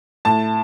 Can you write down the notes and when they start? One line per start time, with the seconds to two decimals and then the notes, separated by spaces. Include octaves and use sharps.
0.25 A2 A5